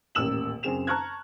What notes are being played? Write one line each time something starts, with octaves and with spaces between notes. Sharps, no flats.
D#1 A1 A#3 E6 E7 F#7
F#2 C#3 C4 G#4 E7 F7
A5 A#5 C#6 F6 F#6 G#6